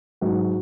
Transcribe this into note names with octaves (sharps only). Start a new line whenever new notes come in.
G#2 F#3 F#4